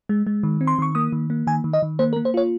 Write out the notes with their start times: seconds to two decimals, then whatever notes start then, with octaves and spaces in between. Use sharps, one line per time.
0.09 G#3
0.27 G#3
0.43 D#3
0.61 C4
0.67 C6
0.78 D#3 C#6
0.95 A#3 D#6
1.12 D#3
1.30 A#3
1.47 D#3 G#5
1.64 D#3
1.73 D#5
1.82 D#3
1.99 A#3 C5
2.13 A#4
2.16 A#3
2.25 C5
2.34 F4 C#5